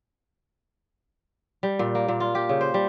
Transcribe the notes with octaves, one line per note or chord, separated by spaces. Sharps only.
G3
A#2
A#3
A#2
F4
G4
C#3
C5
G3